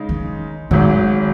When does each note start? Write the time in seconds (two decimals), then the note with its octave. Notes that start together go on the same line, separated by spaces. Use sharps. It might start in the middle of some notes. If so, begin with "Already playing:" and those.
Already playing: C#3 G#3 D#4
0.09 D#3
0.71 G#1 G#2 D#3 F#3